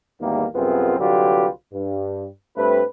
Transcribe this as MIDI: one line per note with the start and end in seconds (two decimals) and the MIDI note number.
0.20 0.45 32
0.20 0.45 40
0.20 0.45 51
0.20 0.45 55
0.20 0.45 58
0.55 0.98 36
0.55 0.98 42
0.55 0.98 59
0.55 0.98 60
0.55 0.98 65
0.55 0.98 68
0.99 1.47 36
0.99 1.47 50
0.99 1.47 54
0.99 1.47 65
0.99 1.47 67
0.99 1.47 71
1.74 2.26 43
2.56 2.82 43
2.56 2.82 57
2.56 2.82 60
2.56 2.82 71